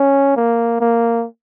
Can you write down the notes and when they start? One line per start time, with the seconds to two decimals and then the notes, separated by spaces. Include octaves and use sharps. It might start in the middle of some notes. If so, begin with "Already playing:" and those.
Already playing: C#4
0.37 A#3
0.81 A#3